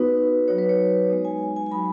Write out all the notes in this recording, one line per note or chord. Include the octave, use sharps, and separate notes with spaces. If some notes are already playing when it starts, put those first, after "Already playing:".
Already playing: B3 D#4 F#4 B4
F#3 D#4 F#4 C#5
B4
C#5
G#3 B3 D#4
G#5
G#5
G#5
F#3 D#4 F#4 B5